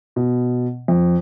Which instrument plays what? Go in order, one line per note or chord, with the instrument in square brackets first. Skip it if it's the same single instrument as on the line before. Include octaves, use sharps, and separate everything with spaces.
[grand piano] B2
F2